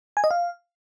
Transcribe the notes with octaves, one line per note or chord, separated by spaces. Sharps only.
G#5
D#5
F5